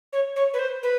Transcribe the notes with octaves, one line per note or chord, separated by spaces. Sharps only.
C#5
C#5
B4
C5
B4